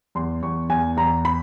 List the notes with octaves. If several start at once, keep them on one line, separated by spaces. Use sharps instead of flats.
E2 C6
E2 C#6
E2 G#5
E2 A#5
B5